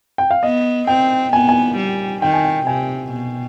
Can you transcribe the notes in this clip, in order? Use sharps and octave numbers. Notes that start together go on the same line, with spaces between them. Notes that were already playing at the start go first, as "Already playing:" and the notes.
G5
F5
B3 D#5
C4 G5
B3 G#5
G#5
G3
D#3 G5
G#5
G5
C3 G#5
B2